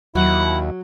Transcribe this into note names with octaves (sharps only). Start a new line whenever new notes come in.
D#2 F#3 E4 F#5